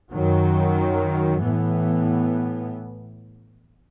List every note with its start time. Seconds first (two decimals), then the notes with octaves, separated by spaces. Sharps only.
0.13 F#2 D#3 F#3
1.42 A2 E3 B3